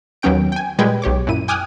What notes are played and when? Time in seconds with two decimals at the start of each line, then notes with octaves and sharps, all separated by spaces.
0.22 D#2 F#3 B3 C#4 G5 D7
0.52 G5 G#5
0.79 A#2 G3 G#3 B4 G5 G#6
1.02 B1 G4 C#5 D6
1.27 F#2 A#2 E4 D#7
1.48 G5 G#5 D6 D#6 F6 F#6